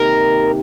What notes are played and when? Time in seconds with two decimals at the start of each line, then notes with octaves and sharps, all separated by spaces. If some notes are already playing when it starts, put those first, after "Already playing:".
Already playing: C3 D#3 A#3 D#4 G4 A#4